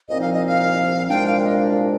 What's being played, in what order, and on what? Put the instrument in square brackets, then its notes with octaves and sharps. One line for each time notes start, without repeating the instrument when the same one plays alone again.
[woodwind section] C2 A#2 F3 C4 D#4 [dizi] D#5
[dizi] F5
D#5
F5
[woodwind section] C2 A#2 G#3 D4 [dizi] G5
[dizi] F5
D#5
F5